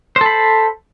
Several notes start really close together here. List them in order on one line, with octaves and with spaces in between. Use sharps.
C5 A4 B5